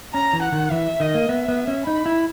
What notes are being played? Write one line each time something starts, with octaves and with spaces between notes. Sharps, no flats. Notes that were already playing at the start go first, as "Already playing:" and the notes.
C#4 A#5
E3
F#5
D#3
E3 E5
D#3 D#5
A#3
B3 E5
B3
C#4
D#4 B5
E4